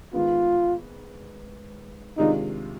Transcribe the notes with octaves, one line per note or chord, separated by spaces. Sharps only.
G#2 D#3 B3 F4
C3 D#3 G#3 D4 D#4 F4